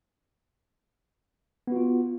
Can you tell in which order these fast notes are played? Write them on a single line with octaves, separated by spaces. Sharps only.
B3 F#4 F4